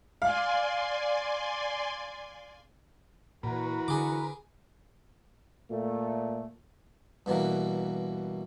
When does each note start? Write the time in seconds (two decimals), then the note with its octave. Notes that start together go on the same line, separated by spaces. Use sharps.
0.22 D5 F5 G#5 C6
3.43 A#2 E3 F#4 A#4 B4
3.88 D3 G#4 D6
5.71 A#2 A3
7.26 G2 B2 E3 A#3